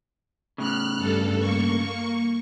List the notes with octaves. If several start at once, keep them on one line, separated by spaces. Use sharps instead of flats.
A2 C#3 F6 F#6
G2 A4
A#3 C#6